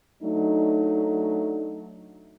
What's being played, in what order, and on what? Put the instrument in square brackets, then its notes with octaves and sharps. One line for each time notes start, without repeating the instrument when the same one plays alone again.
[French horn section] F#3 A3 D4 D#4